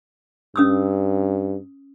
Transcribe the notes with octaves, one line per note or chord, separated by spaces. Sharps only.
G2 C#4 D#6 E6